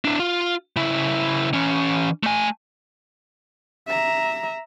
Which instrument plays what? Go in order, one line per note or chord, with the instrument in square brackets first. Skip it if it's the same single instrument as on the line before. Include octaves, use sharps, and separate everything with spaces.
[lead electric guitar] D4 E4
F4
C#3 E4
E3 C#4
A3 G#5
[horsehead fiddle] E5 A#5